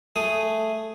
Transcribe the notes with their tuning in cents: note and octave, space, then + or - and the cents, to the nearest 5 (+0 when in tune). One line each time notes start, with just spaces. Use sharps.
A3 +0 G#4 +0 D#6 +0